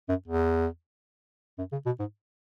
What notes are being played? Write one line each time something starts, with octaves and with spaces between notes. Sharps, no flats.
F#2
E2
F#2
C#3
B2
G#2